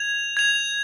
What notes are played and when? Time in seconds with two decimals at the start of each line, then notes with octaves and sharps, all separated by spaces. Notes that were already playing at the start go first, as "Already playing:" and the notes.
Already playing: G#6 F7
0.37 G#6 F7